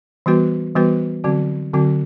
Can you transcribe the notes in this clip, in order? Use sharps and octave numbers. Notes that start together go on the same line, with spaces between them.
E3 G3 B3 F#4 B4
E3 G3 B3 F#4 B4
D3 F#3 C4 F#4
D3 F#3 C4 F#4